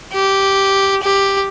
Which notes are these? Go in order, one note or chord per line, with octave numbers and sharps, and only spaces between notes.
G4
G4